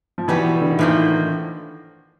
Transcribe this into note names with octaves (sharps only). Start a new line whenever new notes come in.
F3
B2 E3 G3 B3
D3
D#3
A2 E3 F3 A#3
D#3